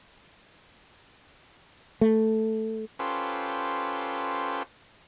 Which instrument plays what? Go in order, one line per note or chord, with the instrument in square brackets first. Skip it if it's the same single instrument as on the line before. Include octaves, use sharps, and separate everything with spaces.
[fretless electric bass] A3
[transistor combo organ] C#4 F4 G4 A4 B4 C5